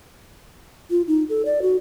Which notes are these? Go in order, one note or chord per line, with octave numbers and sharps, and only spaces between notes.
F4
D#4
A4
D5
F#4